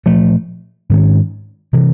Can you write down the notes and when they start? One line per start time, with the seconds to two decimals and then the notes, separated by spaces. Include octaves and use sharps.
0.06 A#2 F3 A3
0.90 G#2 D#3 G#3 C#4
1.73 C3 E3